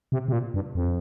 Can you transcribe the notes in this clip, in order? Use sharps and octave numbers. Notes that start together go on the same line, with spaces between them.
C3
C3
A#2
G2
F2